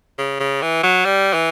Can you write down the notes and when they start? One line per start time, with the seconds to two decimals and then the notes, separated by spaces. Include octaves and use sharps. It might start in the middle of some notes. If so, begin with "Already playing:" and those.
0.18 C#3
0.40 C#3
0.62 E3
0.83 F#3
1.05 G3
1.34 E3